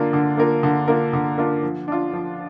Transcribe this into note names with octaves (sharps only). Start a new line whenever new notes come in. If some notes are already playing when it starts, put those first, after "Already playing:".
Already playing: D3 A#3 D4 F4 A#4
D3
A#3 D4 F4 A#4
D3
A#3 D4 F4 A#4
D3
A#3 D4 F4 A#4
F3
D4 F4
F3